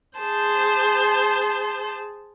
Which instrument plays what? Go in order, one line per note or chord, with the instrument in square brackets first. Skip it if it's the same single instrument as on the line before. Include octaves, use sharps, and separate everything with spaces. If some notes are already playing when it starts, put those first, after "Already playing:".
[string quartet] G#4 C5 A5 G6